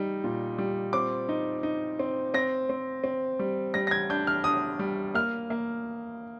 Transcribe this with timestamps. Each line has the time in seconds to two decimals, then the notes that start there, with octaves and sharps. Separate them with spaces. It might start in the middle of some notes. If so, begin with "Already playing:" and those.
Already playing: G3 D#4
0.24 A#2
0.58 G3
0.93 C4 D6
1.29 D#4
1.63 D#4
1.99 C4
2.34 C4 A#6
2.70 C4
3.04 C4
3.39 G3
3.74 G3 A#6
3.87 A#6
3.91 G#6
4.10 D4 G6
4.27 F6
4.44 D4 D#6
4.79 G3
5.14 A#3 F6
5.50 A#3